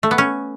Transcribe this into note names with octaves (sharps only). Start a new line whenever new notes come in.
A3
B3
C#4